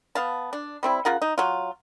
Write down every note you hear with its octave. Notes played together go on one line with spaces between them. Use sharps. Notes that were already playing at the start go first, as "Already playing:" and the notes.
B3 F5 A5
D4
G3 C4 E4
C#3 F4 A#4 F#5
D#4
F#3 F4